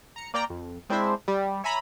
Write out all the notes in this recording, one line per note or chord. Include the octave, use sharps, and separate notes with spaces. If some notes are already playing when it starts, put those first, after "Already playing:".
A#5 C#7
A#3 D5 G5 A#5
F2
G#3 C4 D4 E4 C5 E5
G3
C#5 E5 G#5 A#5 B5